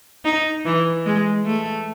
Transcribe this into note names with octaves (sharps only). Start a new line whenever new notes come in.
D#4
E3
G#3
A3